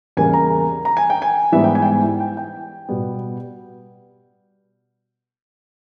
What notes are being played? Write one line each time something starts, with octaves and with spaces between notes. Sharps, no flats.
E2 C#3 G3 A#3 G#5
A#5
A#5
G#5
G5
G#5
G#2 E3 G3 B3 E5
G5
G#5
G5
G#5
G5
G5
B2 G3 B3